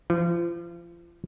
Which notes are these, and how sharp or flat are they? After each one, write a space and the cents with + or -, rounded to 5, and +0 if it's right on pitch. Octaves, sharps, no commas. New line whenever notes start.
F3 -35